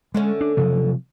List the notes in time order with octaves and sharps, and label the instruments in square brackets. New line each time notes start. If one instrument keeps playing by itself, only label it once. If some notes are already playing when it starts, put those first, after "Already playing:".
[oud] D3 A3 C#4 [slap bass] G#3
[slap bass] D4
C3 F3 F#3